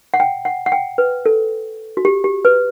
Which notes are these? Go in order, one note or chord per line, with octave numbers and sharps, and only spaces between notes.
F#5
G5
F#5
F#5
G5
B4
A4
F#4
G4
G4
B4